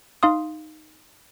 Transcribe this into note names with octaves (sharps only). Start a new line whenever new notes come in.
D#4 F5 C6 D#6